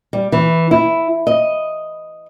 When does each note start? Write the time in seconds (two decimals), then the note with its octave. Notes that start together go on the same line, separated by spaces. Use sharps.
0.13 G3
0.32 E3
0.71 E4
1.27 D#5